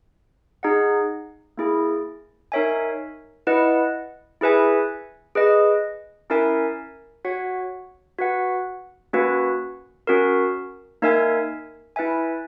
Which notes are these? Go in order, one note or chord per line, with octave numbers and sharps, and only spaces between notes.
D#4 G#4 D#5 F#5
A#3 E4 G#4
D#4 A#4 C#5 E5 G#5
E4 B4 D#5 F#5
E4 G#4 B4 E5 G#5
G#4 B4 D#5
C#4 E4 A#4 E5 G#5
F#4 C#5 F#5
F#4 B4 F#5
A#3 C#4 F#4 B4
C#4 F#4 A#4
A#3 D#4 A#4 E5 G#5
E4 B4 E5 G#5